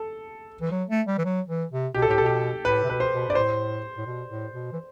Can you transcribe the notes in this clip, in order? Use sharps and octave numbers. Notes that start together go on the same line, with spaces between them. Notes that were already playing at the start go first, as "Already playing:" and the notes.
Already playing: A4
E3
F#3
A3
G3
E3
F#3
E3
C3
B2 G4
A4
A2 G4
B2 A4
G4
A2 B4
C3
B2 B4
C5
B2
G2 D5
A2 C5
A2
B2
A2
B2
E3